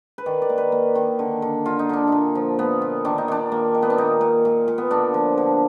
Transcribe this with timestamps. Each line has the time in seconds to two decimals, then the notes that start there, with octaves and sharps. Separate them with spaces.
0.18 B4
0.26 D#3 D5
0.42 D5
0.49 A#3
0.58 B4
0.72 A#3
0.95 D#3
1.19 D3
1.42 D3
1.66 D3 F4
1.79 D#4
1.89 D3 D4
2.08 A#2 D#4
2.35 F3
2.59 A#2 B3
2.82 A#2
3.05 D#3 D4
3.18 D#4
3.28 D#3 D4
3.52 A#3
3.74 D#3
3.82 B3
3.90 D4
3.98 A#2 D#4
4.21 A#2
4.45 A#2
4.68 A#2
4.78 B3
4.91 D3 D4
5.14 F3
5.38 D3